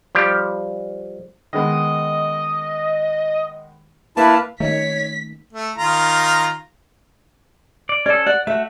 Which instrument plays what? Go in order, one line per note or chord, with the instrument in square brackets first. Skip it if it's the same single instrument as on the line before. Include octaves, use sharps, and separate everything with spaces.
[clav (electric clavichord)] F3 G3 G4
[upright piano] D#3 G#3 B3 [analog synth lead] D#5
[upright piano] A#3 [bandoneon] E4 A5 [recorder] B4 [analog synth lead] F5
[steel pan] D#3 [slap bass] A3 C#4 [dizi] C#5 [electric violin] B6
[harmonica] A3
D#3 F4 A#5
[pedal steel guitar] D5
[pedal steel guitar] C#4 A4 [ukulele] D5
[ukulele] D5 [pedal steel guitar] F#5
[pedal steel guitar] A3 F#4 [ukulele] E5